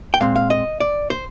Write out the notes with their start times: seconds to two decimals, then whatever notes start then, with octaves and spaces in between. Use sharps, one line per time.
0.14 G5
0.20 A#2 G#3 C4 F5
0.36 F5
0.50 D#5
0.80 D5
1.10 C5